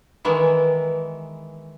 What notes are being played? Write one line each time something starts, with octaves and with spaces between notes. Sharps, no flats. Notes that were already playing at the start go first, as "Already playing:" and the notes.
D#3 E3 G#3 B3